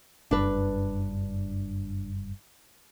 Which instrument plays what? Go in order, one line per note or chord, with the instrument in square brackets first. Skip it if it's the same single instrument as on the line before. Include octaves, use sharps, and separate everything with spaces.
[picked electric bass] F#1 G2 [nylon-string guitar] D4 B4